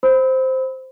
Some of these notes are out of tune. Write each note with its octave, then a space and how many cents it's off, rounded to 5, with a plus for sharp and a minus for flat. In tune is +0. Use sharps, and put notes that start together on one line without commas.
C5 +0 B5 +20 E6 -35